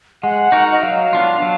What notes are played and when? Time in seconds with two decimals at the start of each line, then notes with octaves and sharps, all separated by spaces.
0.23 G#3 F#5
0.52 D#4 F#4 A#4
0.72 D#5
0.83 F#3 F5
1.13 B3 D4 F4
1.42 F#3